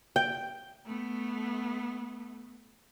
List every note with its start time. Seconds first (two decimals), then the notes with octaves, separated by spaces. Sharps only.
0.16 G5
0.86 A3 B3